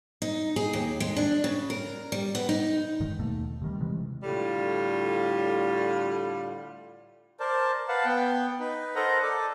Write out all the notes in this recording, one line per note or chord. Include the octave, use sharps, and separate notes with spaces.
D#4
G#4
D#2
G#3
D4
C#3
A#4
G3
B3
D#4
G2 D3 D#3 G#3
D#2 B2 A3 A#3
C3 D#3 G3
C3 E3 G3 G#3
A2 D3 G3 F4
A#4 C5 D5 A5
B4 F5 F#5 A5
B3 G5
D#4 B4
A4 A#4 C5 D#5 F#5 A#5
A4 D5